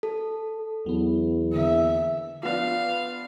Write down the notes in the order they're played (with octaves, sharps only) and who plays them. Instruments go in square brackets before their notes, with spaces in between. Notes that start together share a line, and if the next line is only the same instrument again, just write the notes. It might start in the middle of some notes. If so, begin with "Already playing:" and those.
[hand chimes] A4
[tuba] E2 [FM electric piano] F#3 B3
[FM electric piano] D3 A#3 [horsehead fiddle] E5
[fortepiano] F3 B3 D4 [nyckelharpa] F5